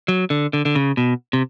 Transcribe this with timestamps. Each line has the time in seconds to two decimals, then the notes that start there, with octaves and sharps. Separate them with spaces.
0.08 F#3
0.30 D3
0.53 D3
0.65 D3
0.75 C#3
0.97 B2
1.33 C3